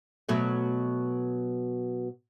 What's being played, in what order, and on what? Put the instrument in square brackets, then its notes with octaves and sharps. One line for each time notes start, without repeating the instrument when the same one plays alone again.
[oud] B2 F#3 A3